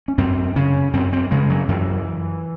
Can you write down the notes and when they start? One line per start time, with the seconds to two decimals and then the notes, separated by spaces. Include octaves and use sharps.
0.08 C#4
0.18 F#2 C4
0.56 C#3 C#4
0.93 F#2 C4
1.13 C4
1.31 C#3 G#3
1.50 F#3
1.68 F#2 E3